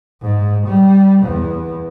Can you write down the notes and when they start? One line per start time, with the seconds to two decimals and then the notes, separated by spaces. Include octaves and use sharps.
0.22 G#2
0.67 G3
1.23 E2